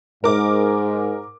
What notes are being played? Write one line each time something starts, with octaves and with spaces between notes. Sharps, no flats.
G#2 A#4 D6